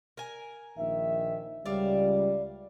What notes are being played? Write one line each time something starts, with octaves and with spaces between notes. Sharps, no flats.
A#4 G#5
A#1 D#3 E5
C#2 G3 D5 E5 F5